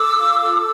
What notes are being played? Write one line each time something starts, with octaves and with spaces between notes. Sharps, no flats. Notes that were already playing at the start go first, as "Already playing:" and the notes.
Already playing: A4 D6 E6
F4
A4